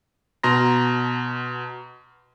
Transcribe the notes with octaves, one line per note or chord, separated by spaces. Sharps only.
B2 A#5 C6 A#6